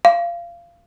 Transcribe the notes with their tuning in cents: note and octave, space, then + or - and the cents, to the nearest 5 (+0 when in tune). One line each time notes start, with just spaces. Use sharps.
F5 -20